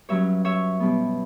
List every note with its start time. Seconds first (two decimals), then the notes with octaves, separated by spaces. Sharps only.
0.09 G2 F#3 C#4 C#5 E5
0.45 C#5 E5
0.80 B2 G3 B3